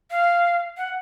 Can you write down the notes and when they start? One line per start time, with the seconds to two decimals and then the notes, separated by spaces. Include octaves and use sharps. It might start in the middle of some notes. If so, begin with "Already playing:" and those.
0.11 F5
0.77 F#5